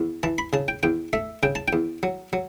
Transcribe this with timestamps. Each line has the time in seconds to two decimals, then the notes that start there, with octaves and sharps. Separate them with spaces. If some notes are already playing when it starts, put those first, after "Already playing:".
Already playing: E2
0.23 E3 A5
0.38 B5
0.53 C#3 A5
0.68 G5
0.83 E2 G5
1.13 A3 E5
1.43 C#3 G5
1.55 A5
1.68 G5
1.73 E2
2.03 F#3
2.33 F#3